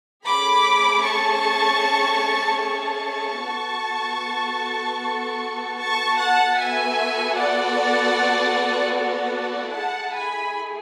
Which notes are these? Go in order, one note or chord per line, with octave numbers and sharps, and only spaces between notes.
A3 C#4 G#4 B5 D6
A5 C#6
A5 C#6
B3 F#4 A4
A5 C#6
F#5 A5
B3 F#4 A4 E5 G#5
D5 F#5
D5 F#5
A3 E4 G#4 F#5 A5
G#5 B5